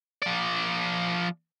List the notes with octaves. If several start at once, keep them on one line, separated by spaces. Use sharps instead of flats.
F3 D5